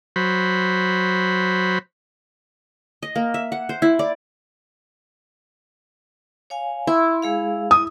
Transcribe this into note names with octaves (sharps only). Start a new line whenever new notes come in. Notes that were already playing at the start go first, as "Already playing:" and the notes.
F#3 C5 B5
D#5
A#3
E5
F#5
C5
E4
D5
C#5 F5 G#5
E4 E5 B5 C6
G#3 G#4 F5
E4 D#6